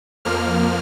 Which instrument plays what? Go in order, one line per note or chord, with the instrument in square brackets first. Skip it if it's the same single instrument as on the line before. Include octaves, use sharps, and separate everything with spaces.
[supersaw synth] F2 F3 A#3 F6